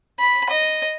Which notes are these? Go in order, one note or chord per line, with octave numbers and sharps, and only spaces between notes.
B5
D#5